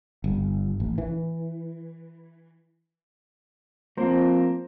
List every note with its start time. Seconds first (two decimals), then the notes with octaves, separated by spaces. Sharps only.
0.24 G1
0.80 A1
0.98 E3
3.97 F3 A#3 C4 C5